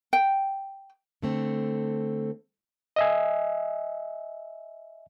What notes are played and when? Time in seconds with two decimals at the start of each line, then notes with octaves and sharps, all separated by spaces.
0.13 G5
1.22 D3 A3 C4
2.96 D#5 E5 G#5